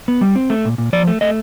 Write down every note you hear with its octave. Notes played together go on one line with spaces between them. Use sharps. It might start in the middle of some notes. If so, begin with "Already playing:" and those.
B3
G3
C4
A3
A#2
A#2
F3 D5
A3
A3 D#5